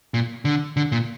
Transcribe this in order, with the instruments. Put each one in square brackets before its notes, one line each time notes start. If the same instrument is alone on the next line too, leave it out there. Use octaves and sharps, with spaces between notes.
[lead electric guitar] A#2
D3
D3
A#2